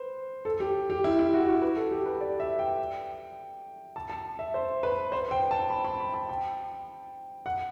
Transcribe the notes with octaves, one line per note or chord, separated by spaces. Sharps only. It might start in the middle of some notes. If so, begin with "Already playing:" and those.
Already playing: B4 C5
A4
G4
G4
E4
E4
F#4
F#4
B4
A4
G4
B4
D5
E5
G5
A5
A5
E5
C5
B4
C5
G5
A5
B5
B5
B5
A5
G5
F#5